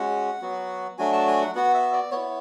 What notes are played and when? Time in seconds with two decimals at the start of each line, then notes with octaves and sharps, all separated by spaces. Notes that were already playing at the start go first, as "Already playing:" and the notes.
Already playing: G#3 C#4 F#4 F#5
0.42 F#3 B3 F#4
0.98 F#3 A3 D4 F#4 G#5
1.13 A5
1.27 G#5
1.41 F#5
1.55 B3 F#4 F#5
1.74 E5
1.93 D5
2.11 B3 E4 C#5